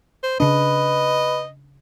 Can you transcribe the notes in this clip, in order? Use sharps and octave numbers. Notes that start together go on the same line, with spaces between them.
C5
C#3 D4 B4 D#5